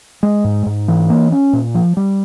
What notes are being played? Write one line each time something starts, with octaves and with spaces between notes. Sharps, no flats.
G#3
G#2
G#2
E3
A#3
C#4
A#2
F3
G3